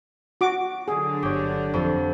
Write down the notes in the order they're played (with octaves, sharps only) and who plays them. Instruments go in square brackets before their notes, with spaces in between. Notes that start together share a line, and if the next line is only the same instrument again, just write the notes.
[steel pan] F#4 D6
[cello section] D3 F#3 D4 [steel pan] G#4
[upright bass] G1 [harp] G4 C#5
[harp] F2